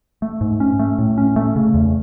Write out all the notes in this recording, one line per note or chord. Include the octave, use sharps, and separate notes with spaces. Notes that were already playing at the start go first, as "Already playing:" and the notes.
A3
G#2
C#4
A3
A2
C#4
A3
C#3
E2